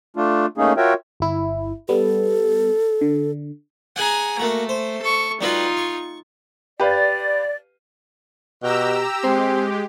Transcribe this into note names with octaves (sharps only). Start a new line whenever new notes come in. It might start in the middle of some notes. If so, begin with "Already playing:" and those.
A3 D4 F4
A3 A#3 C#4 D#4 G#4
F4 F#4 A#4 C#5 E5 G5
G1 E4
G3 B3 A4
D3
G#4 F#5 G#5 A#5
A3 A#3 F#4
C5
A4 C#6
G3 D#4 F4 F#4 B4
C#6
G4 B4 D5 F5
B2 G4 A#5 E6
G#3 C4 G4